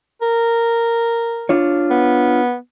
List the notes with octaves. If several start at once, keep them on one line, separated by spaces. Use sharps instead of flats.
A#4
D4 F4 C#5
B3